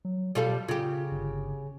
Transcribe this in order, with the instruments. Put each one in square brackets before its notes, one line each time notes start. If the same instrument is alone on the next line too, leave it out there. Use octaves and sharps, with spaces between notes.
[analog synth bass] F#3
[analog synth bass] B2 [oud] G3 F4 A4
[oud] C#3 G4 [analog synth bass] F4
[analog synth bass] G1